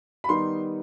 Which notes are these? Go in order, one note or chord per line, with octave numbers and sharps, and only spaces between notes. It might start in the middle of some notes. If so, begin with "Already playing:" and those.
B5
D#3 G3 B3 D#4 C6